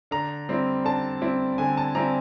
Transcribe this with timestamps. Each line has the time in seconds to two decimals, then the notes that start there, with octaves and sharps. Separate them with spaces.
0.11 D3 A#5
0.49 G3 C4 E4
0.84 D3 A5
1.21 G3 C4 E4
1.58 D3 G#5
1.77 A5
1.95 G3 C4 E4 A#5